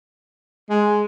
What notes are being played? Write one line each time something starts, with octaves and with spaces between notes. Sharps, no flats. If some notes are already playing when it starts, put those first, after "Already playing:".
G#3